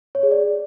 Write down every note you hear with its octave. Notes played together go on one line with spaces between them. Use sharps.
C#5
G#4
D5